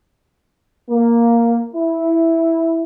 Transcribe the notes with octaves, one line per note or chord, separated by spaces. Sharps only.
A#3
E4